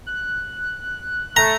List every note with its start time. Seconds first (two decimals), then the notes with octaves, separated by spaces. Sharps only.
0.06 F#6
1.36 A3 A#5